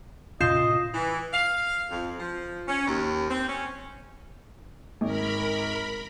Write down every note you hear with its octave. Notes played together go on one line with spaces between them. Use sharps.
A2 C3 C#4 F4 D#5 G6 C7 E7
E3
F5
F2
F3
C#4
D#2
C4
C#4
G#1 A#4 B5